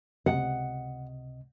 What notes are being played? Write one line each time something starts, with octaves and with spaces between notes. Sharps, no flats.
C#2 C3 D#5 F#5